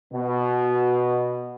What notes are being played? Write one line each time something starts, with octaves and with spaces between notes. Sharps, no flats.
B2